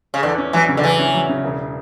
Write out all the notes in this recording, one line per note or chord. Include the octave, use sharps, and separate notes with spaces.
C#3
E2 D3
C#4
E3 F#3
C#3
D3
E2 E3
C#4
F#3
C#3
E1